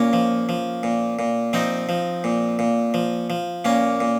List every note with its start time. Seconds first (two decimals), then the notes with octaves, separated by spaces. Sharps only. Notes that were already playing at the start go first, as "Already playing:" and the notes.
Already playing: A#2 A#3 C#4
0.13 F3
0.49 F3
0.83 A#2
1.19 A#2
1.53 F3 C4 D#4
1.89 F3
2.24 A#2
2.59 A#2
2.94 F3
3.30 F3
3.65 A#2 A#3 C#4
4.00 A#2